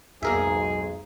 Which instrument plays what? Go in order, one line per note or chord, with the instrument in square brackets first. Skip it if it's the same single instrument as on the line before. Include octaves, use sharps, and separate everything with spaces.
[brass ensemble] B1 G#2 [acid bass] F2 [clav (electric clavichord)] A#3 A#4 E5 [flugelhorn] G#4